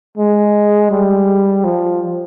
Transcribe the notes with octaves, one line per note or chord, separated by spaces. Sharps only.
G#3
G3
F3